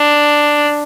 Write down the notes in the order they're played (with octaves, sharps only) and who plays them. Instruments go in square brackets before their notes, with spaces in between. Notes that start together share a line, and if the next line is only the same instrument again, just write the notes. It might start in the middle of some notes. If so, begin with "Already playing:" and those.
Already playing: [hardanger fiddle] D4